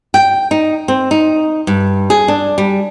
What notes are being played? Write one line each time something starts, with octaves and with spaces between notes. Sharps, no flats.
G5
D#4
C4
D#4
G2
G#4
D4
G3